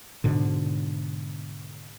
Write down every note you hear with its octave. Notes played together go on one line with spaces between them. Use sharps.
G#2 B2 D3